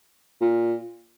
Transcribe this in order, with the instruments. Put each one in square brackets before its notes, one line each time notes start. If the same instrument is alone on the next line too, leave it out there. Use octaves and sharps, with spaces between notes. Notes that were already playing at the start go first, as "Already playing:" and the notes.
[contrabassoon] A#2